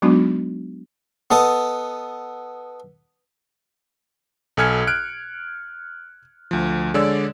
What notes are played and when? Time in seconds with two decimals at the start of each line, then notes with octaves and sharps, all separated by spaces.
0.02 F#3 G#3 B3 D4 D#4 F#4
1.31 B3 A4 D#5
4.57 B1 A4 G#5 F6 G#6 C#7
4.87 F6 F#6 D7
6.51 D2 F3
6.94 D3 G#3 C#5 D5 E6